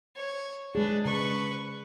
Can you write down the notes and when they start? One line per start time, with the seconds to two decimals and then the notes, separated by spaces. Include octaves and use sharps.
0.17 C#5
0.75 G#3 D4 G#4 B4
1.05 C#3 B4 C#6